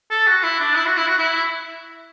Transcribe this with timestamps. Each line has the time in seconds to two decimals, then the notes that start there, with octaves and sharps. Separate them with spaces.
0.11 A4
0.27 F#4
0.43 E4
0.60 D4
0.76 E4
0.86 F#4
0.97 E4
1.07 F#4
1.18 E4